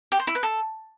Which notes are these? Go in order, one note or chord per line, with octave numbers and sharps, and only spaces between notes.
G4
C5
E4
B4
A4